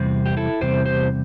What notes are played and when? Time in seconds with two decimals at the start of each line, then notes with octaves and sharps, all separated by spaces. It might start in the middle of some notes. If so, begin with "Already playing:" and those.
Already playing: E2 C3 G3 C4
0.26 G4
0.37 E4 A4
0.61 E2 C3 G3 C4 G4 C5
0.86 G4 C5